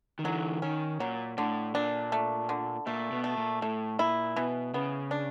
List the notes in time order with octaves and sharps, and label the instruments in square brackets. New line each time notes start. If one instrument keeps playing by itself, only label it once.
[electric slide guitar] D#3
[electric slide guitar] D3 E3 [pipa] F#3
[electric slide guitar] D#3 [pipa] C#4
[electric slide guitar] A#2 [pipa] F#3
[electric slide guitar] A2 [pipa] D3
[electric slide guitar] A#2 [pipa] D4
[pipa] A3
D3
[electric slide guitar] A#2 [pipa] A3
[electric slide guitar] B2
[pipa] A3
[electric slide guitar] A#2
[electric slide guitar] A2 [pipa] A3
[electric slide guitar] A#2 [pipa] E4
[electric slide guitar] B2 [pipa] E3
[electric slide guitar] C#3 [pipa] B3
[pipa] D4